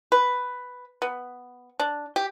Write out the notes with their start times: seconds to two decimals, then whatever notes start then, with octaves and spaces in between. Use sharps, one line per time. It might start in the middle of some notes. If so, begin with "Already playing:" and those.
0.12 B4
1.02 B3
1.80 D4
2.16 G4